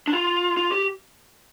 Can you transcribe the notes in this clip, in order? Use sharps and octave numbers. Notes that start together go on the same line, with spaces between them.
D4
F4
F4
G4